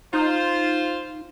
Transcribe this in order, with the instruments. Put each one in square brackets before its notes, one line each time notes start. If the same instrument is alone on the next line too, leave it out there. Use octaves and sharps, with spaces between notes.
[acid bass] D#4 [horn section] F4 C5